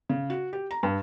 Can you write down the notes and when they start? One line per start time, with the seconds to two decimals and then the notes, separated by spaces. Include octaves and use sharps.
0.09 C#3
0.30 F#4
0.53 G4
0.71 A#5
0.83 G2